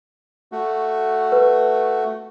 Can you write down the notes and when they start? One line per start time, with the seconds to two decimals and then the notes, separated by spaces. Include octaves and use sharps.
0.52 A3 F#4
1.32 B4